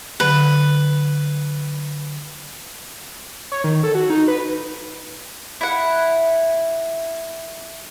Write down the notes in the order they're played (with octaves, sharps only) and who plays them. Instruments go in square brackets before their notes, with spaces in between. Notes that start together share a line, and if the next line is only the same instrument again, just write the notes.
[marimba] D3 F#3 [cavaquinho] B4
[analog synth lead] C#5
D#3
A4
F#4
D#4
B4
[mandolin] E4 F#5